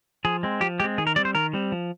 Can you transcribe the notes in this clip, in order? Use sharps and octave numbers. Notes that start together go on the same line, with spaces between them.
F3 G#4
G#3 C4
F3 G4
G#3 C4 G4
D#3 G#4
A#4
G3 C4 D5
C5
D#3 A#4
G3 C4
F3